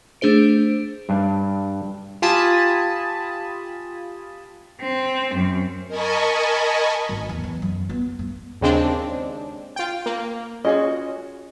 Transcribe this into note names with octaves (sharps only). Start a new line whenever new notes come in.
A3 D4 G#4 C5 D7
G2 D4
F4 G4 G#5 A5 B5 D#6
C4
F#2
A#4 D#5 G#5 A5 B5 C#6
G#1
E2
E2
F#2
B3
G2
D#2 C#3 G#3 C4 D4
F4 G5
A#3
C#4 F4 F#4 G#4 D#5